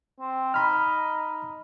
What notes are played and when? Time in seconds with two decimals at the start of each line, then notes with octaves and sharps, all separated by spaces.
0.20 C4
0.54 D#4 B5 F6